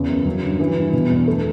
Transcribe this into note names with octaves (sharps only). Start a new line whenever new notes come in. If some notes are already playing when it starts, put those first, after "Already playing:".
Already playing: E2 C#3
F#2
F#3
G2
E3
G2
B2
E2
A3